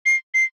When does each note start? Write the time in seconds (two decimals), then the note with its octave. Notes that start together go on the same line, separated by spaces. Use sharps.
0.06 C7
0.34 C7